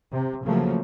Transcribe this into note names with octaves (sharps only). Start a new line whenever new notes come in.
C3
C#3 F3 F#3 A3 A#3